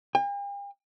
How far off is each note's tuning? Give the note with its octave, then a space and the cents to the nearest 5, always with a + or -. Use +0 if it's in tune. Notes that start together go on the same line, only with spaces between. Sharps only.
G5 +45